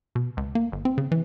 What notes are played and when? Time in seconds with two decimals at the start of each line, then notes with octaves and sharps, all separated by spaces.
0.15 B2
0.37 C#2
0.55 A#3
0.72 G1
0.85 C4
0.98 C#3
1.12 E3